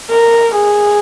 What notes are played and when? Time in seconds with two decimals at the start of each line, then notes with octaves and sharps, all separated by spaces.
0.11 A#4
0.56 G#4